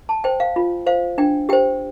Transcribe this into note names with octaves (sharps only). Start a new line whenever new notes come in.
A5
C5 G5
F5
F4
C5 F5
D4 G5
G4 C5 G5